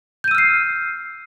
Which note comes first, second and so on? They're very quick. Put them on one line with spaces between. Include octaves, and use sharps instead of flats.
G6 D#7 E6 F6 C7